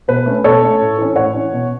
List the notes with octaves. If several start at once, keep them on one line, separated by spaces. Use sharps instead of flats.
B2 B4
A3 C#4
B2 A4 C#5
A3 C#4
A2
E3 C#4
A2 C#5 F#5
E3 C#4
B2